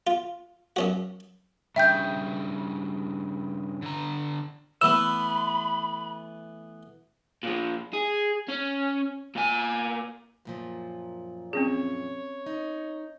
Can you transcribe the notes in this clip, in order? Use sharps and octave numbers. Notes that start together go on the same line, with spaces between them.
F4
F#2 C#4 F#4
G2 C#3 E5 G5 G6
D3 A#5
E3 A3 B3 B5 E6
A#2 F3
G#4
C#4
A#2 G#5
F#2 A#2 F3
C4 C#4 G#4 C#5
D#4